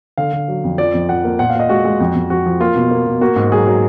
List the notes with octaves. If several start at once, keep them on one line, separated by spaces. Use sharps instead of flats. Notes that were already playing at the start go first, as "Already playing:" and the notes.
D3 F5
D3
F#3
F2
F3 D5
F2
F3 F#5
A#3
A#2 F#5
F5
A#2
D#5
G#3 F#4
G#3
F2
F2
F2 F#4
F3
A#3 F4
B2
A#3
B2
A#3 F#4
G#2
F#3 G#4
F#3